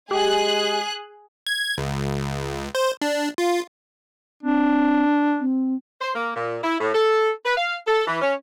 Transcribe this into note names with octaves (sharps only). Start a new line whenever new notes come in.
G#3 G4 G#4 F#6
G#6
C#2
C5
D4
F4
C4 D4
C4
C5
A#3
A#2
E4
A2
A4
B4
F5
A4
E3
C#4